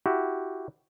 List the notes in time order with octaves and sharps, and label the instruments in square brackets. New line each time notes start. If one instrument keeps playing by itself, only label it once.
[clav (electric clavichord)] E4 F#4 G4